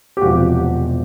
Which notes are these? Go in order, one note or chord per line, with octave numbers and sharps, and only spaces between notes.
G4
E1 E2 C3 F3 F#4